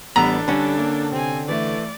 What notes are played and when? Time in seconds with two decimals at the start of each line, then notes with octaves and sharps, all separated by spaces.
0.16 A1 G3 B3 D4 A4 A#5 E6 B6
0.48 D3 G3 C#4
0.78 A#3
1.12 C3 C4 G#5
1.48 E3 A3 D5